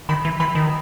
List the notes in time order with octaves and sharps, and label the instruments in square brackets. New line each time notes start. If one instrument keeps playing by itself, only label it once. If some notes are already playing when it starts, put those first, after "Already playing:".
[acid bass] D#3 [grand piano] B5
[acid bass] E3
[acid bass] E3 [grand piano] B5
[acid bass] D#3